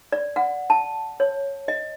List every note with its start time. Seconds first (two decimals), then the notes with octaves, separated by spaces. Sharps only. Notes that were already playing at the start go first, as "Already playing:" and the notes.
0.12 D5
0.36 F#5
0.70 A5
1.20 C#5
1.68 D#5